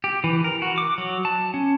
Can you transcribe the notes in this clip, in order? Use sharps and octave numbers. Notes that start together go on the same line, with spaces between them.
G4
E3
A#4
F#4
D6
F#3
A5
C#4